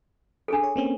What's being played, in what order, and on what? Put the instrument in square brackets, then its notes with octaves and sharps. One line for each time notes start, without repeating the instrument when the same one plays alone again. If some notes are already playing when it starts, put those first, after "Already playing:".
[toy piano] D4 G#4 A4
[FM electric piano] C#5
A#3 C4 C#4